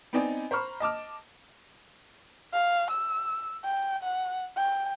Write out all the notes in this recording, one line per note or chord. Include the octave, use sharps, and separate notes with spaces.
B3 C4 D#4 D5 D#5 G#5
C5 A#5 B5 C#6 F6
D#5 A5 D6 F6
F5
E6
G5
F#5
G5